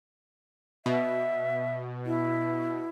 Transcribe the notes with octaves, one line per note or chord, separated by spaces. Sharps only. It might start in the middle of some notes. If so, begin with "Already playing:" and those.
B2 E5
E4